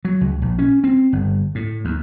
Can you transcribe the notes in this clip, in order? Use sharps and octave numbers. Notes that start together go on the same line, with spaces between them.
F#3
C#2
A#1
C#4
C4
G1
A2
D#2